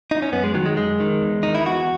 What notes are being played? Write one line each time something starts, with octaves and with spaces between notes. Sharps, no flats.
D#4
C#4
F#2 B3
G#3
D#3 F#3
G#3
F#2 G#3
D#3
E2
D#3 D#4
E4
E2 F#4